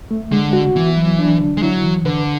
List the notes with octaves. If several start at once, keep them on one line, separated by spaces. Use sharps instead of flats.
A3
D3 G#3
F#4
E3 B3
F#3
D4
D3
G#3
F#3 E4
E3
D3 B4